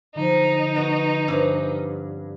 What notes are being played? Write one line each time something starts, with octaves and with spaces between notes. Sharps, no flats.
D3 F3 D#4
B3 F#4
G2 C4 C#4 F#5